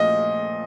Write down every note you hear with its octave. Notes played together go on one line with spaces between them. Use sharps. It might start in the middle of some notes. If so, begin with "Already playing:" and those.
Already playing: A#2 F3 A3 D#5